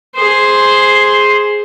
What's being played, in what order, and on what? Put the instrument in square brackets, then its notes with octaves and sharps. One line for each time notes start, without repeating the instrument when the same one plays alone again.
[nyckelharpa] G#4 C5